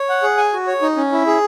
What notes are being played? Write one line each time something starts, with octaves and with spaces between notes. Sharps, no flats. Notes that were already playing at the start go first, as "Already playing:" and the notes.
Already playing: C#5
F#5
G#4
G#5
F#4
C#5
D#4
C#4
E4
G#4